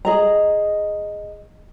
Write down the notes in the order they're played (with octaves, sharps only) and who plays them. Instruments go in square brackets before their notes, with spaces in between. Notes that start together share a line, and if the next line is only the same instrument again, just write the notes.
[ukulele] G#4 D#5 A#5